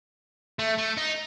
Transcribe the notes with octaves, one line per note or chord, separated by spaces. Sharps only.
A3
A3
D#4